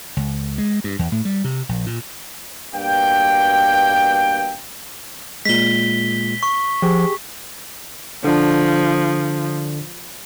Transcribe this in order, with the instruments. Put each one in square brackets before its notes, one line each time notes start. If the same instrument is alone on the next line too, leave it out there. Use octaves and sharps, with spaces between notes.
[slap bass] C#2
G#3
G2
E2
A2
G3
C3
A#1
A#2
[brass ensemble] G2 B2 A#3 G5
[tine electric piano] A#2 G#3 [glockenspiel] B6 G7
[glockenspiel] C#6
[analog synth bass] F3 [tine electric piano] G4 G#4
[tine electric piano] D3 D4 [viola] F3